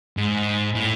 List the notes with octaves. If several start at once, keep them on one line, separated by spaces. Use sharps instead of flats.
G#2
A2